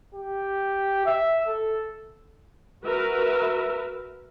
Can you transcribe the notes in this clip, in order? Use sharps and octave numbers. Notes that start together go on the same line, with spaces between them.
G4
E5
A4
F#4 A#4 B4 E5